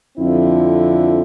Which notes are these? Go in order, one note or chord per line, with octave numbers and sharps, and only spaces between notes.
F2 D3 F3 C4 E4